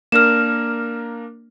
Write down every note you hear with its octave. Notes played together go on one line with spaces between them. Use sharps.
A#3 D4 A#4 F6 E7